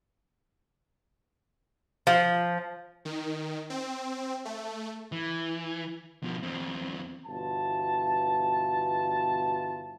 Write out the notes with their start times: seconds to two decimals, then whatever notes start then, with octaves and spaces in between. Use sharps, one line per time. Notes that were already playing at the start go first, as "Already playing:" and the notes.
2.07 F3
3.05 D#3
3.70 C4
4.45 A3
5.12 E3
6.23 B2 F3
6.43 E2 C4
7.26 G1 B2 E3 F4 A5